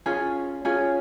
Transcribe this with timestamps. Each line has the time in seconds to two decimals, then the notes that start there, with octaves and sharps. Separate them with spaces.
0.06 C#4 F4 G#4
0.65 C#4 F4 G#4